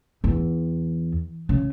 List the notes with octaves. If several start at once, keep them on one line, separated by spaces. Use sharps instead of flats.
E2
C#3